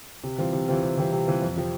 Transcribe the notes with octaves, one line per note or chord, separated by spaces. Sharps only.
C3
E3 G3 C4 F4
C3
E3 G3 C4 F4
C3
E3 G3 C4 F4
C3
E3 G3 C4 F4
F2
C3 F3 C4